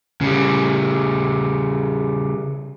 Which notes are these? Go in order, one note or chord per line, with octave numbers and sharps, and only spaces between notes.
C#3 G3